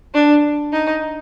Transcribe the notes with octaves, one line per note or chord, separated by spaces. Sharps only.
D4
D#4